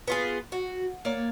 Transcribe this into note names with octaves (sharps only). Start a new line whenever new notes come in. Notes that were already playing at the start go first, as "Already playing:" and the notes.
B3 F4 G#4
F#4
A#3 C#5 D5